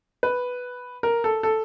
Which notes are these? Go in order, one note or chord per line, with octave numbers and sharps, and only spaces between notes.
B4
A#4
A4
A4